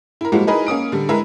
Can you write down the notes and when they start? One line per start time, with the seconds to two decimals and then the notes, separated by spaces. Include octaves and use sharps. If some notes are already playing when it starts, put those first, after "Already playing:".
0.21 E4 A#4
0.32 F3 G3 G#3 A#3 E4 F#4
0.47 D#4 E4 G#4 A#4 B4 D#5
0.67 A#3 C#4 D#6 D7
0.92 D3 G3
1.09 G#3 E4 G#4 A#4 B4 E5